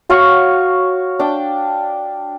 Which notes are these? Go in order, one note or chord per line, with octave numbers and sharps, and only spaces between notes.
F#4 C#5 F5 C#6
D4 G5